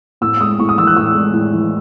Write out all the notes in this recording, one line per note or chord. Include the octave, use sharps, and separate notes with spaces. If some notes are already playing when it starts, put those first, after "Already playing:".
A2 E6
G#3 D#6
A2 C#6
D#6
E3 E6
F#6
A2 E6
G#3
A2
E3